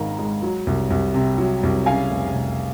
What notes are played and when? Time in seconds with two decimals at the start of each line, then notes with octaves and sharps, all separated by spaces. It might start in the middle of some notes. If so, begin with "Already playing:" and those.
Already playing: G#1 G#2 D#3 F5 A#5
0.19 G#3
0.42 F#3
0.67 C2
0.90 C2
1.14 C3
1.38 F#3
1.63 C2
1.86 C#3 F5 G#5
2.11 F1
2.35 F1